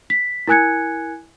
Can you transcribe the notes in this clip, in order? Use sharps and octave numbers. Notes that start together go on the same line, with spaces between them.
B6
E4 A#4 G#5 F#6 G#6 C#7